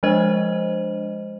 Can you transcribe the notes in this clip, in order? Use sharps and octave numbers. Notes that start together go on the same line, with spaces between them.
F3 G#3 D4 C5 D#5